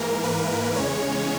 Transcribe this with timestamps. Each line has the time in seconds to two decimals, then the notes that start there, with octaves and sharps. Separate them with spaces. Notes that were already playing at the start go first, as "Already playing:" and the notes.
Already playing: G#2 E3 A#3 A#4
0.23 B4
0.76 E2 C#3 G#3 C#4 C#5